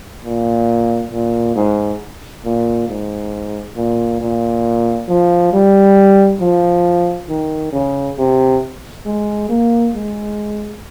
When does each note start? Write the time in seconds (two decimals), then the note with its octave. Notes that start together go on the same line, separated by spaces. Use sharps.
0.24 A#2
1.12 A#2
1.55 G#2
2.45 A#2
2.88 G#2
3.76 A#2
4.21 A#2
5.08 F3
5.53 G3
6.41 F3
7.28 D#3
7.72 C#3
8.18 C3
9.06 G#3
9.49 A#3
9.94 G#3